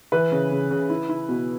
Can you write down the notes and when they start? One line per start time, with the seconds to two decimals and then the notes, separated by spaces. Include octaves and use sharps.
0.12 E3 B4
0.32 C#3
0.51 C#3
0.70 C#3
0.90 E4
1.09 E4
1.29 B2